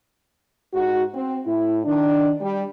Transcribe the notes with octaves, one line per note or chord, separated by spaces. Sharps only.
G#2 D#4 F#4
C4
A2 E4
D#3 D4
G3